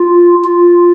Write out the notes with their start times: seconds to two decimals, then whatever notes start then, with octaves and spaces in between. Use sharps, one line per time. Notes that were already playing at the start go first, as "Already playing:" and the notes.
Already playing: F4
0.44 F4